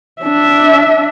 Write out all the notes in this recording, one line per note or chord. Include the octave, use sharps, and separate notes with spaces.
D4 E5